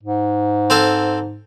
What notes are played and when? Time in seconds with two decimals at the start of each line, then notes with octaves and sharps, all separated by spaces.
0.03 G#2
0.70 C4 A4 F5